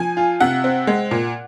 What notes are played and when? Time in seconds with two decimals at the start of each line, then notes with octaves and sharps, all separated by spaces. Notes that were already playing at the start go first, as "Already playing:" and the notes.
Already playing: F3 G#5
0.17 F4
0.40 C3 F#5
0.64 C4
0.87 G#3
1.11 A#2